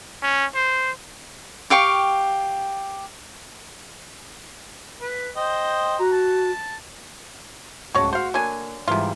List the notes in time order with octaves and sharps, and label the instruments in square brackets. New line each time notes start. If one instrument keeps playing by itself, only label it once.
[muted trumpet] C#4
C5
[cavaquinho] G4 F5 G5 C#6
[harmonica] B4
C5 D#5 G5
[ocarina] F#4 [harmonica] A#5
[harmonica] A5
[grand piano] D1 C#2 A5 [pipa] F#4 C#5
[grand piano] F#4 [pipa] C5 F5
[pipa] D3 F#3 G#5 [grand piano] A#3
[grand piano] G#2 E3 G3 [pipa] C3 F4